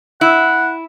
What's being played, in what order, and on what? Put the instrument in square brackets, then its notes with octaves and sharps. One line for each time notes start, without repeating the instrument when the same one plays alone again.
[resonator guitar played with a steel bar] E4 [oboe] F#5